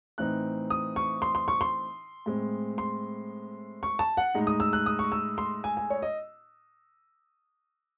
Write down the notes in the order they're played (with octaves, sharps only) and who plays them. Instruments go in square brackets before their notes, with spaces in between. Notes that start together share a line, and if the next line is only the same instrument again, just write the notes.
[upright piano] A2 E3 C4 D#4 F#6
D#6
C#6
C6
C6
C#6
C6
A2 G#3 C4
C6
C#6
A5
F#5
A2 G#3 D#4
D#6
E6
F#6
D#6
C#6
E6
C6
G#5
G#5
C#5
D#5